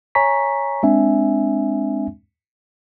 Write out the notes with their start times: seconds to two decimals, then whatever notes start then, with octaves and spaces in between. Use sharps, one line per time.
0.15 C#5 G#5 A#5 C#6 B6
0.83 G#3 C4 D4 E5 G#5